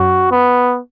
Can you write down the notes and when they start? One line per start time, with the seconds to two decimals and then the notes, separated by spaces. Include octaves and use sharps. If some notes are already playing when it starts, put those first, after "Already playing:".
Already playing: F#2 F#3 F#4
0.31 B3